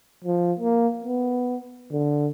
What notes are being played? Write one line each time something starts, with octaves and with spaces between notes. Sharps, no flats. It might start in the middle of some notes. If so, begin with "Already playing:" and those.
F3
A#3
B3
D3